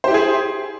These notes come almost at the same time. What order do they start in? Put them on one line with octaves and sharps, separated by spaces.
C5 G4 E4 G#4